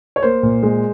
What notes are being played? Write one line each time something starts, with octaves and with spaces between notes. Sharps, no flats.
C#5
A#3 C5
A#2
G#3